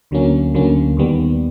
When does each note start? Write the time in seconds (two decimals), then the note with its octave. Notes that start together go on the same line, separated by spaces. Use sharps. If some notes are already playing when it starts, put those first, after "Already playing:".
0.11 D2 D3 F#3 A#3 C#4
0.54 D2 D3 F#3 A#3 C#4
0.97 D#2 D#3 G3 B3